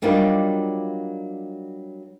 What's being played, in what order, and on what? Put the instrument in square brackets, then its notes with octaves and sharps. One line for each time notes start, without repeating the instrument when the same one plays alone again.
[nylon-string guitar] F#3 G3 A#3 D4 D#4 F4